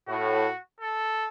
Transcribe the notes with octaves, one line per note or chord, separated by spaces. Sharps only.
A2 F#4
A4